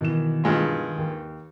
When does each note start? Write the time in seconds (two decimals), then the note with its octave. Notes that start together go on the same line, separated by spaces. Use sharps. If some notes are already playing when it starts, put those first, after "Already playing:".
0.01 B2 D#3 E3 E7
0.44 G2 G#3 F4
0.98 D#2